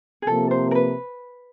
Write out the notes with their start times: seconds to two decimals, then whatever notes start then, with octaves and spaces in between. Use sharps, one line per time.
0.22 G#4
0.27 C3 F3 A#3 A4
0.51 C5
0.71 A#4
0.75 B4